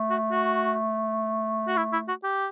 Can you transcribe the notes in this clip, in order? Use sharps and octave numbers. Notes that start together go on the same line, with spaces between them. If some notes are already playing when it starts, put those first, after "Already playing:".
Already playing: A3
F#4
F#4
F#4
E4
E4
F#4
G4